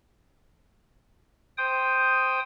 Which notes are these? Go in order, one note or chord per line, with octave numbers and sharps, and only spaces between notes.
C5 G5 D#6